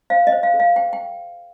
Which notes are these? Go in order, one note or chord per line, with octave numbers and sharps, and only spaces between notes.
C5 F5
D#5
C5
F5
A4
F5
C5 G5
G5